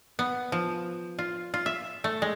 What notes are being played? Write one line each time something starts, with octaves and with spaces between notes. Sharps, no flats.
B3
F3
F4
F4
E5
A3
G#3